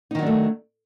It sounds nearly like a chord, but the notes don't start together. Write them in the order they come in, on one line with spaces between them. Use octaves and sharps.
D#4 D#3 F#3 D4 A3